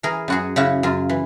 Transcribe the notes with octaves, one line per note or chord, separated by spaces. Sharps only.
E3 G#4 A#4
F#2 F#4 G#4
C#3 E4 F#4
F#2 F4
E3